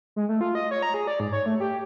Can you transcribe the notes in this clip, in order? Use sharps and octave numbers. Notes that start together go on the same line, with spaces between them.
G#3
A3
F4
D#5
C#5
A#5
G#4
D5
G#2
C#5
A3
G4